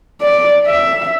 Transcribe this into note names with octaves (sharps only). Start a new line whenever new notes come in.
D5
E5